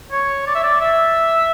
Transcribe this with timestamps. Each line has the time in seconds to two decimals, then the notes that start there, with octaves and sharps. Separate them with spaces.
0.11 C#5
0.47 D5
0.55 E5
0.64 D5
0.81 E5